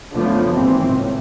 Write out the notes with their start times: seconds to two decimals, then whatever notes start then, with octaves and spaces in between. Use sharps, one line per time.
0.13 F#2 D3 F3 A3 B3
0.52 G#1 D#2 E3 C4
0.86 C#2 A2